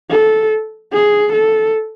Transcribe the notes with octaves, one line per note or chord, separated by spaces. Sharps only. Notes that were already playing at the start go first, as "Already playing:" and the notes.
A4
G#4
A4